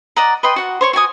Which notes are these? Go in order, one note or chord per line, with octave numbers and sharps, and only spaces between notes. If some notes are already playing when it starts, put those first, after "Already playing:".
D5 D#5 F#5 A#5
B4 D#5 G5 C6
F#4 F#5
C5 C#5 C#6
F#4 G5 G#5 D#6